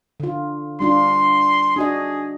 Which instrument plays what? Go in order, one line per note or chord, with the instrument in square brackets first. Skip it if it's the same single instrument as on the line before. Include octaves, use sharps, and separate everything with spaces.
[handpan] D3 F4
[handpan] G3 D4 F4 [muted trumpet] C6
[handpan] D4 F#4 D#5 [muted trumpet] G#4